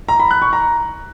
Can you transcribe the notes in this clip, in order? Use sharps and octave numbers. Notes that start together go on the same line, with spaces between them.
A#5
B5
F#6
C#6
A#5